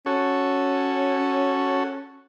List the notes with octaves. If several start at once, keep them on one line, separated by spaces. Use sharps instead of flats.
C#4 F#4 A4 C#5